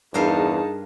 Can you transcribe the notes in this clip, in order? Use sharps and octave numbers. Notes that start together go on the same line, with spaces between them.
E2 G2 D#4 G#4 A#4 F5 A5